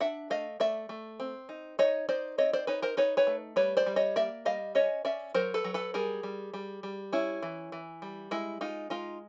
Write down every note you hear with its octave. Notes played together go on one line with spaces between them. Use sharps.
D4 E5 F#5
A3 D#5 F5
A3 D5 E5
A3
C4
D#4
D#4 C#5 D#5
D#4 C5 D5
C4 C#5 D#5
C5 D5
D#4 B4 C#5
A#4 C5
D#4 B4 C#5
B4 C#5
A3
G3 B4 C#5
C5 D5
G3
C#5 D#5
A#3 D5 E5
G3 D#5 F5
C#4 C#5 D#5
C#4 D5 E5
F#3 A#4 C5
A4 B4
F#3
A4 B4
G3 G#4 A#4
G3
G3
G3
C#4 E4
E3
E3
G3
G#3 E4
G#3 D#4 F4
G#3 D#4 F4